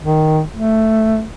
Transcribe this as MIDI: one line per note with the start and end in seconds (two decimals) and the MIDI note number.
0.03 0.42 51
0.53 1.24 57